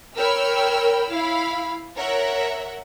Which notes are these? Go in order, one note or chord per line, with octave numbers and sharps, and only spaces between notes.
A#4 C#5 G5 B5 E6 F6
E4 F5 B5
A#4 C#5 E5 F#5